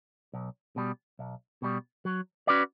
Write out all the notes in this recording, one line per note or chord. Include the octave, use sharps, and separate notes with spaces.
B1
B2 G3
B1
B2 G3
F#3
C#4 F#4 B4 D5